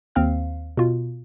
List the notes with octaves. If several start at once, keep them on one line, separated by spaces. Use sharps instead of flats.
D#2 C4 F5 F6
B2 F4